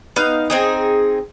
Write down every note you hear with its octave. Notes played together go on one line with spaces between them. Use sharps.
B3 D#4 F5
C4 D#4 G#4